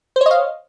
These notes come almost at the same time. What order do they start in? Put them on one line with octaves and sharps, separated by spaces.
C5 C#5 D#5 F5